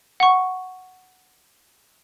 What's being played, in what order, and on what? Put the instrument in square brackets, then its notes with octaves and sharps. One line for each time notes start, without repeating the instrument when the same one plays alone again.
[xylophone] F#5 C#6